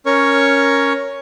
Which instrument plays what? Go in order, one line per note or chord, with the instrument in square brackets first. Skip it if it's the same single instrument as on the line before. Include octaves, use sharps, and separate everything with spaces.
[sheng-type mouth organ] C#4 A#4 C#5 C#6